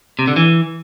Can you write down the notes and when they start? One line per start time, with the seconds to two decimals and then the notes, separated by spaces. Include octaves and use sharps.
0.19 C3
0.28 D3
0.36 E3